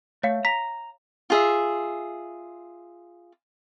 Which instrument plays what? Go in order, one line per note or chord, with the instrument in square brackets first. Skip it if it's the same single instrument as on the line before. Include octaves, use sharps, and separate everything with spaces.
[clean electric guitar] A3 [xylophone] C#5 F5 C#7
[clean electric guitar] A#5 [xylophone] B6
[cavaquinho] F4 G#4 E5